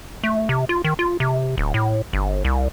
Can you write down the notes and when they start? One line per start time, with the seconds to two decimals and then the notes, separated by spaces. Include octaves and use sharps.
0.23 A3
0.49 C3
0.69 F4
0.84 D#3
0.99 F4
1.20 C3
1.58 D1
1.74 A2
2.13 G1
2.45 C2